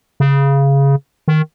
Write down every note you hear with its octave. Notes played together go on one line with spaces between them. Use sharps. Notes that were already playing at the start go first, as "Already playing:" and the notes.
C#3
D#3